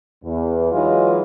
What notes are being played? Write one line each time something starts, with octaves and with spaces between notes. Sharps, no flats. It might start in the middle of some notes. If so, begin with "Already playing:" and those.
E2
E3 F#3 G#3 D#4 F4